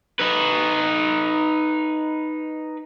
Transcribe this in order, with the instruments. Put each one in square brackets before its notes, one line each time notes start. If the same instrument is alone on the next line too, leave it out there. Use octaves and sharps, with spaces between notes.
[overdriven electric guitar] D#4 B4